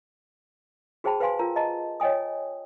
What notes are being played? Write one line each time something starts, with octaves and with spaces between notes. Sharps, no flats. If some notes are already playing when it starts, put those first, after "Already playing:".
F#4 G#4 C5 G5 A5 B5
B4 C5 F5 G#5 C6
F4 A#4 A#5
D#5 A5 A#5
C#5 D#5 G5 G#5 D#6